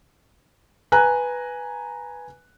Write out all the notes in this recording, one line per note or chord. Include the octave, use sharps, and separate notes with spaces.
B4 G#5 A#5 F#6